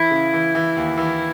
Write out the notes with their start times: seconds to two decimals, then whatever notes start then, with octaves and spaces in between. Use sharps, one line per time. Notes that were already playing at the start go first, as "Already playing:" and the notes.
Already playing: E3 E4
0.11 C#3
0.33 E3
0.55 E3
0.77 D#2
0.97 E3